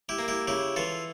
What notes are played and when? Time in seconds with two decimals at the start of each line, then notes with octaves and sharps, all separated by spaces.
0.09 E4 G4
0.19 A#3
0.28 E4 G4
0.47 C#3 E4 G4
0.76 E3 F4 A4